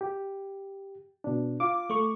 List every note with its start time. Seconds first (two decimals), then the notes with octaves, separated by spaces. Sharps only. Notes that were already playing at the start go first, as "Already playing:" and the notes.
0.01 G4
1.24 B2 D4
1.60 F4 F5 D6
1.90 A3 C#6